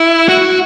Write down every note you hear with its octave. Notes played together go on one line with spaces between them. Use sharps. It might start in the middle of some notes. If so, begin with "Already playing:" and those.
Already playing: E4
F#4